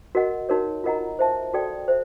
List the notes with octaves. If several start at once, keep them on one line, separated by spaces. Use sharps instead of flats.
F#4 A#4 D#5 F#5
D#4 F#4 A#4 C#5
F4 A#4 D#5 F#5 A#5
C5 E5 A5
F#4 A4 D5 G5
C5 E5